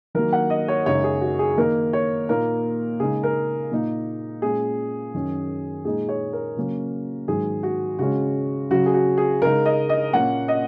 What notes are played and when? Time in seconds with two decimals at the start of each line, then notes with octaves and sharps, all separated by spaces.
0.15 D#3 F#3 A#3 A#4
0.33 F#5
0.50 D#5
0.68 C#5
0.86 F#2 C#3 G#3 D#4 C#5
1.04 G#4
1.21 F#4
1.39 G#4
1.58 D#3 A#3 D#4 A#4
1.93 C#5
2.29 A#2 A#3 D#4 A#4
3.00 C#3 G#3 D#4 G#4
3.23 A#4
3.71 A#2 A#3 D#4
4.42 A#2 G#3 C#4 G#4
5.14 F#2 D#3 F#3 C#4
5.85 A#2 G#3 D#4 G#4
6.09 C#5
6.33 A#4
6.57 C#3 F#3 A#3 C#4
7.28 G#2 D#3 F#3 G#4
7.63 F#4
7.99 C#3 G#3 C#4 F#4
8.70 C#3 F#3 C#4 F#4
8.86 G#4
8.94 F#4
9.18 G#4
9.42 C#3 G#3 D#4 A#4
9.66 D#5
9.89 D#5
10.13 A#2 A#3 C#4 F#5
10.48 D#5